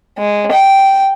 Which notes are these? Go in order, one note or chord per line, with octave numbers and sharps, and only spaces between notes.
G#3
G5